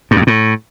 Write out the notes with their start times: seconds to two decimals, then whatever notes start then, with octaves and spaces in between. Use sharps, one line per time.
0.11 G2
0.16 F2
0.22 G2
0.27 A2